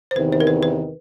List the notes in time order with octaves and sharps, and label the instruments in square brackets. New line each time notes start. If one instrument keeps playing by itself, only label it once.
[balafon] C5
[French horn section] E2 C3 D#3 [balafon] B4
[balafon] C5
A#4
B4
B4